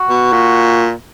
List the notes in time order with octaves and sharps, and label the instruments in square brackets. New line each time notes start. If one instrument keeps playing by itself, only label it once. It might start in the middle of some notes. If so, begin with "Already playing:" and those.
Already playing: [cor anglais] F#4
[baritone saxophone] B2
A#2